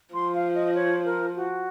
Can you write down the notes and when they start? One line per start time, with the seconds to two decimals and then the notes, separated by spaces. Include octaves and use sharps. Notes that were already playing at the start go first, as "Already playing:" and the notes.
0.14 F3 C6
0.34 F5
0.55 D#5
0.75 C#5
1.05 A#4
1.36 F#4